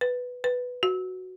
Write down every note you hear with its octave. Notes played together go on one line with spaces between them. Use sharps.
B4
B4
F#4